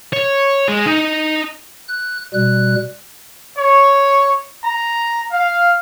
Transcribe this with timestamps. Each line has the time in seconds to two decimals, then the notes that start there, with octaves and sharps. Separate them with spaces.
0.13 C#5
0.68 G#3
0.86 D#4
1.88 F#6
2.34 B2 G3 F#6
3.58 C#5
4.64 A#5
5.32 F5